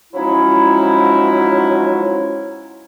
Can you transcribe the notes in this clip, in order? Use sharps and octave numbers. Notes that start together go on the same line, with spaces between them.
F3 F#3 G#3 C#4 D#4 E4